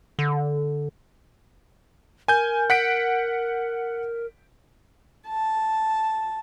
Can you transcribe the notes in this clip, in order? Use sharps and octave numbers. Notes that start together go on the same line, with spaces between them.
D3
A#4 G#5 G6
F#5 B6 D7
A5